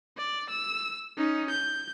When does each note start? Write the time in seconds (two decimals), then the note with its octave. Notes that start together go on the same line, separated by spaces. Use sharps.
0.17 D5
0.50 E6
1.17 C#4 D#4
1.50 G6